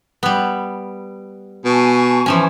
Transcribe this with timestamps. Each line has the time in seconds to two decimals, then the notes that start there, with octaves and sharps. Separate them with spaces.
0.23 G3 B3
1.65 B2 G#5 A5 C#6
2.26 E3 F3 C#4